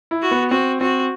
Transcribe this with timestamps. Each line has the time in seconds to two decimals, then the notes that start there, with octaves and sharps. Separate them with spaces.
0.11 E4
0.22 F#4
0.31 B3
0.51 C4 F#4
0.81 C4 F#4